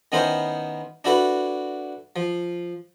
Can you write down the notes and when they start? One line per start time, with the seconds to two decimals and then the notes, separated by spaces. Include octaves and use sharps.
0.12 D#3 B3 C#4 E4 A#4 C5
1.04 D4 E4 F#4 A4 B4
2.16 F3